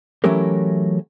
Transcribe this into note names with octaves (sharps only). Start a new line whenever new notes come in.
E3 F#3 A3 C#4 G4 A#4